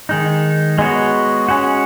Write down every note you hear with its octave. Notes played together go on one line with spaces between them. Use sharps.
D#3 G#3 D#4
G#3 B3 F#4 C#5
G#3 C#4 F#4